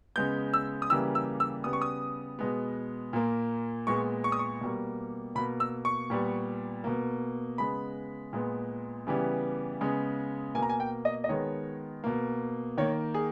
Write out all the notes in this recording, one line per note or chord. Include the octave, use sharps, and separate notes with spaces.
C#3 G#3 B3 G6
E6
D#6
C#3 E3 G3 A#3 E6
E6
E6
C#3 G3 B3 D#6
C#6
D#6
B2 G#3 B3
A#2 A#3
A#2 G#3 B3 C#6
C#6
D#6
C#6
B2 G3 A#3
B2 A#3 B5
E6
C#6
A#2 G3 B3
B2 A#3
C#3 G#3 B3 B5
A#2 G#3 B3
C#3 E3 G3 B3
C#3 G#3 B3
B2 A#3 G#5
A#5
G#5
G5
D#5
D#5
D#3 G#3 B3 C#5
B2 A#3
D#3 A#3 C#5
G#4